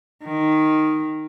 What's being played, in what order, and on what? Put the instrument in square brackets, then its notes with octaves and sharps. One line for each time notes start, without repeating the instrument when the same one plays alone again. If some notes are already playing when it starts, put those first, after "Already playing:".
[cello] D#3